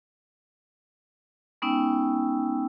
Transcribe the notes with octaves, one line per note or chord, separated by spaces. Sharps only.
G#3 B3 C#4 D#4 G5 E6